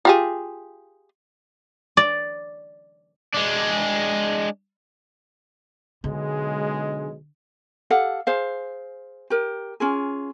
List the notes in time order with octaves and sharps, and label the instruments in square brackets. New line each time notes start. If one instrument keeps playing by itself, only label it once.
[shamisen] F4 G4 G#4
[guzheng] D5
[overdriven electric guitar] G#3 D4
[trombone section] B1 G#3 [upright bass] D3
[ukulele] G4 A4 F5 F#5
G#4 C5 F5
G4 A#4
C#4 F4 G#4